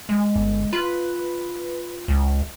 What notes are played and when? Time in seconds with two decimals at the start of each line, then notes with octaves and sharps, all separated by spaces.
0.09 G#3
0.35 G1
0.73 F4 B4
2.08 C#2